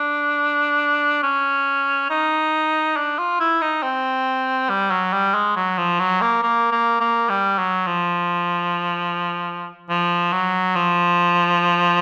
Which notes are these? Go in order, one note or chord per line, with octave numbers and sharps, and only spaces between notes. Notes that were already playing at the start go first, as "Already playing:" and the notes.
Already playing: D4
C#4
D#4
D4
F4
E4
D#4
C4
G3
F#3
G3
G#3
F#3
F3
F#3
A#3
A#3
A#3
A#3
G3
F#3
F3
F3
F#3
F3